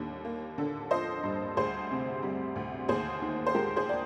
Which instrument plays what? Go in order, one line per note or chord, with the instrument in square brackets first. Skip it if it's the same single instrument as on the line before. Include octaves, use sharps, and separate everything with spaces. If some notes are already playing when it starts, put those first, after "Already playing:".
Already playing: [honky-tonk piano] D#2 D3 G3
A#3
D3
F3 C5 D#5
G2
D2 G#4 C5
C3
G3
D2
D#2 G#4 C5
D#3
C5
G#3 G4 A#4
G#4 C5
D5